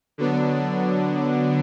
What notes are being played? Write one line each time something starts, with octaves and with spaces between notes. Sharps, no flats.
D3 F#3 B3 D4